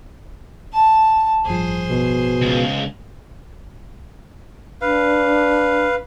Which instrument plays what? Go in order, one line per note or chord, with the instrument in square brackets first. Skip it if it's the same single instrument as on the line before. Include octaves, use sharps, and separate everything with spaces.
[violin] A5
[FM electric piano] A1 G2 F3 [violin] G#4 C5
[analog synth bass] B2
[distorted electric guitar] C#2
[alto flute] D4 [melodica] B4 F5